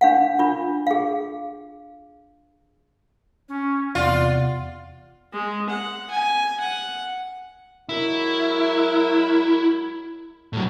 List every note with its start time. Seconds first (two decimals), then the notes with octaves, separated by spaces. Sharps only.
0.01 D4 F5 F#5
0.39 D4 F4
0.87 G#4 F5
3.49 C#4
3.95 E2 C3 F4 D5 F#5
5.33 G#3
5.70 F#5
6.11 G#5
6.60 F#5
7.89 F#3 G#3 E4 A#4
10.53 A2 F#3